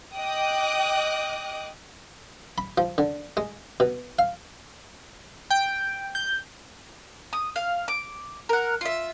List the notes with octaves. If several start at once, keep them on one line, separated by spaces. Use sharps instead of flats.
D#5 G5 D6 D#6 F#6
B5
F3
D3
G#3
B2
F5
G5
G6
D#6
F5
D6
A#4 F#5
F4 E5